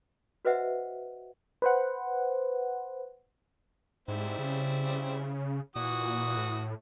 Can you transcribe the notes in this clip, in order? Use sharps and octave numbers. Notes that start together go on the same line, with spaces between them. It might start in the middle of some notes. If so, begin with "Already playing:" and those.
F#4 B4 C5 D#5 E5 F#5
B4 C5 F#5
G#2 G3 C4 E4
C#3
A#2 E3 F#4 D#6
A2